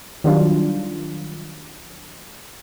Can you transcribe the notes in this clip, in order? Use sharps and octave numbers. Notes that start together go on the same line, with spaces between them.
D#3 F#3 G3 D4 F4